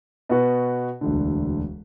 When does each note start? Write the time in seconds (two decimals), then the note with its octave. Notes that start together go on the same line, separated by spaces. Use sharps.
0.29 B2 B3 F#4 B4
1.01 E1 D2 D3